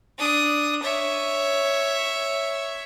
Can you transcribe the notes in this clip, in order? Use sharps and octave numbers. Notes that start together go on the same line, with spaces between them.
D4 D#6
C#5 E5